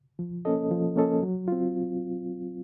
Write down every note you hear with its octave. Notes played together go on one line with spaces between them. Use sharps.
F3
A#3 C#4 A4 D#5
F3
A#3 C#4 A4 D#5
F#3
C4 F4